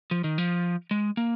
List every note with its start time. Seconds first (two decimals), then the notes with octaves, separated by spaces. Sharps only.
0.11 F3
0.24 D#3
0.38 F3
0.91 G#3
1.17 A#3